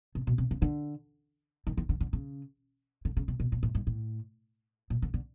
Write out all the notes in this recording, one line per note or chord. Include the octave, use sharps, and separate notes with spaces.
C3
B2
C3
C#3
D3
D#3
D#3
D3
D3
C#3
D3
C#3
C3
B2
A#2
A2
G#2
A2
A#2
D3
D3